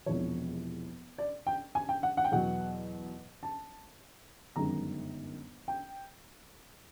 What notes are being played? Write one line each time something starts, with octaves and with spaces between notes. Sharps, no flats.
E1 E2 C3 F3 C#5
D5
G5
G#5
G5
F#5
F#5
G5
E2 B2 F#3 F#5
A5
G1 F#2 D#3 G#3 A#5
G5